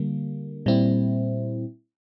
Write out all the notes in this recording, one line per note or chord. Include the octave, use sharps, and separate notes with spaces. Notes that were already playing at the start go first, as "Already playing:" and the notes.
Already playing: D3 G3 A#3
A#2 G3 C4 E4